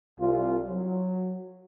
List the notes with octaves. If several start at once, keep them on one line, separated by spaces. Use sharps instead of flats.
C2 F4
F#3